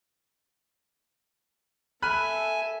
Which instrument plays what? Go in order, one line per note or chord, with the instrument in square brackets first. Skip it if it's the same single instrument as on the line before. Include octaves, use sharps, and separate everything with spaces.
[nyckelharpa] A4 E5 [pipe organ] G#5 [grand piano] B5 F6 F#6